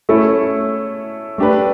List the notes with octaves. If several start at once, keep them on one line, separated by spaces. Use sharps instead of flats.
A3 C#4 E4 A4
A3 D4 G4 B4